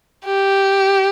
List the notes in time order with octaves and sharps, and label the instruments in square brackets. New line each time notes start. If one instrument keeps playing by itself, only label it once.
[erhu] G4